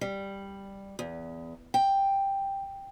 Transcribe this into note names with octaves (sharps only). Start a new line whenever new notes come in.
G3
E2
G5